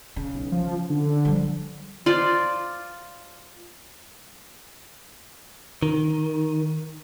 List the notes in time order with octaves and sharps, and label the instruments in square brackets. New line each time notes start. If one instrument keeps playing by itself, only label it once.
[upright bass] C#3
[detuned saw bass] B1
F3
D3
[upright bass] F3 G3
[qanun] F4 C5 D5
[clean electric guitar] D#3